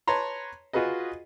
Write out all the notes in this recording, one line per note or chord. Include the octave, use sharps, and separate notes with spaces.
B4 C#5 A5 A#5 C6
F4 F#4 G#4 B4 D#5